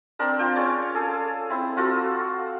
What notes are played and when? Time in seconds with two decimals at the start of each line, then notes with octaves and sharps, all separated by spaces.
0.19 C4 D4 A#4
0.39 F4 G5
0.55 C#4 G#4 C#5 D5
0.94 G#4 A4
1.50 C4 E4
1.77 F4 F#4 A4